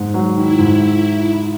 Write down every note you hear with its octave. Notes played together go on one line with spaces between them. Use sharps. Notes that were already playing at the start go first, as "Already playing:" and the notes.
Already playing: G#2
F#3
D#3 E4
G#2